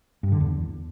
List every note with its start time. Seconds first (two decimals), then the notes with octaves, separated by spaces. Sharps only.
0.23 G2
0.32 D3
0.41 E2